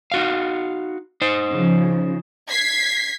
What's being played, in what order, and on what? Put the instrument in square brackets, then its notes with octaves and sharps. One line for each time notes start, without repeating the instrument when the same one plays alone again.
[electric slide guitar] D#4 F#4 F5
D#4 C5
[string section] C#3 F3
[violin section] G#6 B6 C7